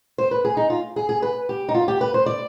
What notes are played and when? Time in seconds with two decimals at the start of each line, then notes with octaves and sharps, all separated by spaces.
0.18 C5
0.31 B4
0.45 G#4
0.57 D#4
0.70 F4
0.96 G#4
1.09 G#4
1.22 B4
1.49 G4
1.69 D#4
1.75 F4
1.88 G4
2.01 B4
2.14 C5
2.26 D5